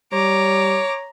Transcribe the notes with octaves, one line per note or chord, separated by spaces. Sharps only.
G3 C#5 A#5 D6